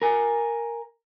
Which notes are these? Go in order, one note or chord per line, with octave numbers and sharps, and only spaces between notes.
A#4 G#5